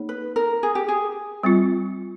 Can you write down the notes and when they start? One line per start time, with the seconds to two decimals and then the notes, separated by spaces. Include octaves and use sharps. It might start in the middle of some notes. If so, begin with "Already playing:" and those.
Already playing: A#3 D#4 G#4 C#5
0.09 B4
0.36 A#4
0.63 G#4
0.75 G4
0.88 G#4
1.43 G3 C4 F4